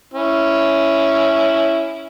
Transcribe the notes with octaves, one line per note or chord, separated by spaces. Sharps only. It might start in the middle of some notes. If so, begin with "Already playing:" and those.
C#4 E4